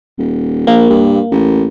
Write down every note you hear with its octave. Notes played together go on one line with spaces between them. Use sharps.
D#1
A#1 A#3
G2
A1